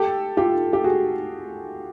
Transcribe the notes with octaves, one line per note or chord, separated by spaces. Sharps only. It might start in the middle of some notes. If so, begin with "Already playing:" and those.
Already playing: G4 A4
F4 G4
G4
F#4 G#4